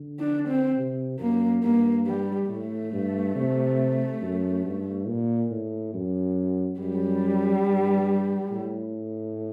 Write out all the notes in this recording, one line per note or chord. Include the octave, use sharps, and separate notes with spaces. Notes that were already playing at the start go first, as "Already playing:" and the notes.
Already playing: D3
D4
C4
C3
F#2 A#3
G2 A#3
G3
A2 A3
G2
C3
F#2
G2
A#2
A2
F#2
F#2 G3
G2
A2